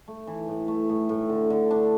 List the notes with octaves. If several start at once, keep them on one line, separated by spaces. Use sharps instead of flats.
A3
E3
A2
A3
A2
A2
D3
D3
D4